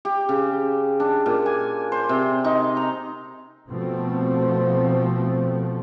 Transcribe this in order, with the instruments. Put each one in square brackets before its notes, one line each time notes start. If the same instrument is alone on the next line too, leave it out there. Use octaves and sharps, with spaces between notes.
[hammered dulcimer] G4
C#3
D4
A#2
G#5
C5
C3
D#4
A#5
[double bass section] B2 F3 A3 C4